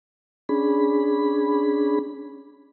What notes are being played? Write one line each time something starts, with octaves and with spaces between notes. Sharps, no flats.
C#4 D4 G#4 B5